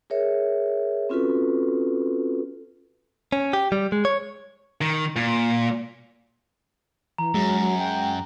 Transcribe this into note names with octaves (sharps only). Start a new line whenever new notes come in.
G#4 A#4 C#5 E5
C4 C#4 F4 F#4 A4 B4
C#4
G4
G3
G#3
C#5
D#3
A#2
E3 A#5
F#2 F#3 G#3
F#3
G5